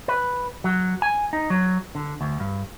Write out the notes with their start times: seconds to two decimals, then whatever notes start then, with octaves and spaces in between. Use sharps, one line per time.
0.08 B4
0.64 F#3
1.02 G#5
1.33 D#4
1.50 F#3
1.95 D3
2.21 D2
2.40 G2